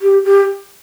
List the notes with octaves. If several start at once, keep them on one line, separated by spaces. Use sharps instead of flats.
G4
G4